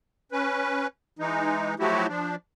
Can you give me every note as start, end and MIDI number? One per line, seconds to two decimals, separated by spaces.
0.32 0.87 61
0.32 0.87 71
1.19 1.75 52
1.19 1.75 56
1.19 1.75 63
1.80 2.07 53
1.80 2.07 54
1.80 2.07 57
1.80 2.07 64
1.80 2.07 66
1.80 2.07 67
2.08 2.36 53
2.08 2.36 62